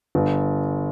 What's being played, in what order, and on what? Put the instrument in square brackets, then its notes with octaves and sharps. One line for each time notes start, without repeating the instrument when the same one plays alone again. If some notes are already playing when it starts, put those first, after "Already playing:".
[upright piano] G1